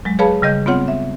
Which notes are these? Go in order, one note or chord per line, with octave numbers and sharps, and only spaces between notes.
F#3 G#3
G#4 B4 C#5 F5 A5 B5
C#3 G3 D#5 G6
B3 C4 F4 C#5 F#5
E5